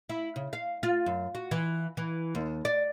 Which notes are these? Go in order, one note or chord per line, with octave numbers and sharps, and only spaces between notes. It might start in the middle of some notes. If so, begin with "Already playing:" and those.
E4
C#3
F5
F4
F#2
F#4
E3
E3
D#2
D5